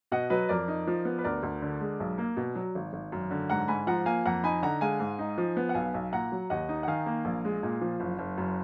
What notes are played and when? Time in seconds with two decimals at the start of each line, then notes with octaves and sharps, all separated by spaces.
0.12 B2 D#5 F#5
0.30 F#3 B4 D#5
0.49 F2 A#4 D5
0.68 D#4
0.87 F3
1.05 B3
1.19 B4
1.24 D2 A#4 D5
1.43 D2
1.62 D3
1.81 G#3
2.00 B1
2.18 A#3
2.37 B2
2.55 F#3
2.75 G#1
2.93 G#1
3.12 F#2
3.31 D3
3.50 G#2 F#5 A#5
3.68 G#2 G#5 B5
3.87 F3 F#5 A#5
4.06 A#3 F5 G#5
4.26 F2 F#5 A#5
4.44 D#4 G#5 B5
4.62 D3 F#5 A#5
4.81 G#3 F5 G#5
4.99 G#2
5.19 D#4
5.38 F3
5.57 B3
5.69 F#5
5.75 B1 F5 G#5
5.94 B1
6.12 A#2 F#5 A#5
6.32 F#3
6.50 D#2 D#5 F#5
6.69 D#4
6.83 F#5
6.88 D#3 F5 G#5
7.06 A#3
7.25 A#1
7.45 G#3
7.63 A#2
7.81 F3
8.00 F#1
8.19 F#1
8.38 F#2